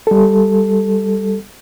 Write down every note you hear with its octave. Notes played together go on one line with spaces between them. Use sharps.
G3 A4